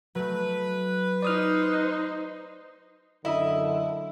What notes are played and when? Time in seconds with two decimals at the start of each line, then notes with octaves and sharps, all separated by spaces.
0.15 F#3 A3 B4
1.22 D#4 C5 D5 D#6 F6
3.25 F#2 D3 E4 D#5 E5 D#6